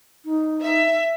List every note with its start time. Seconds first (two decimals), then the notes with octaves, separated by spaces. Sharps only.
0.25 D#4
0.61 E5